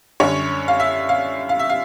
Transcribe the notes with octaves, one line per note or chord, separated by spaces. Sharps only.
F#2 D3 G3 C#5
F5
E5
F5
F5
E5
F5